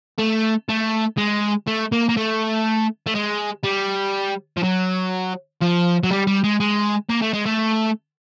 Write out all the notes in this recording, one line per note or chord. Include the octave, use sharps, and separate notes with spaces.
A3
A3
G#3
A3
A#3
A#3
A3
A3
G#3
G3
F3
F#3
F3
F#3
G3
G3
G#3
G#3
A#3
A3
G#3
A3